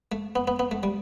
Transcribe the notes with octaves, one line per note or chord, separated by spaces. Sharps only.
A3
B3
B3
B3
A3
G3